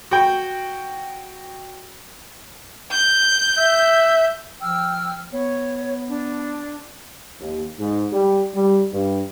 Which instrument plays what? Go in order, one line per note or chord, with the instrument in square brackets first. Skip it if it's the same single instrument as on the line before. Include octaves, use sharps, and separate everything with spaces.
[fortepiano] F#4 G5
[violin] G6
[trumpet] E5
[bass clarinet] F3 [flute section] G5 E6 F6
[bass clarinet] B3 [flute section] C#5
[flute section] D4
[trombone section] D#2
G#2
G3
G3
G2